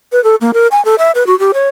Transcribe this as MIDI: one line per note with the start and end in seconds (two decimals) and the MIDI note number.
0.12 0.22 71
0.24 0.35 69
0.41 0.51 58
0.54 0.67 70
0.71 0.83 80
0.85 0.95 69
0.98 1.11 76
1.15 1.26 71
1.27 1.38 66
1.39 1.51 67
1.54 1.68 73